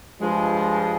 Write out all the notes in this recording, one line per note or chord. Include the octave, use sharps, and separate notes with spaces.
G2 F3 G#3